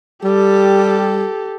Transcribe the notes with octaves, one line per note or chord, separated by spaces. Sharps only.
G3 G4 A4